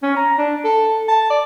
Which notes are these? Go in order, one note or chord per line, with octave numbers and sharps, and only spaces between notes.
C#4
A#5
D4
A4
A5
D5